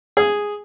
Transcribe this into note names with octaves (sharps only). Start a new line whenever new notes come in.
G#4